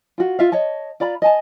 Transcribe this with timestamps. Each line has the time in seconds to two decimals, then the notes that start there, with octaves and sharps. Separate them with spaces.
0.18 F4 F#4
0.39 F4 E5 F5
0.52 C#5 D#5 A5
1.00 F4 D5 A#5 B5
1.22 D#5 G#5 A5